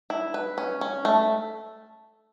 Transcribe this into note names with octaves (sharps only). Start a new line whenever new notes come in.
E4
B4
C#4
C#4
A3